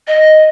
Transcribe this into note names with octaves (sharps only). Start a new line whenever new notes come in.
D#5